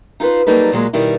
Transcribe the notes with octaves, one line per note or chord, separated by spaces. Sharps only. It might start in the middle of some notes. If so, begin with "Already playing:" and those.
D#4 F4 G#4 B4 C5
F#3 G3 A#3 D#4 A4 B4
A#2 F#3 G#3 A#3
B2 D#3 G3 E4